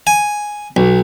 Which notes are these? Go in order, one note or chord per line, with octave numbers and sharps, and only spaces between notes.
G#5
B1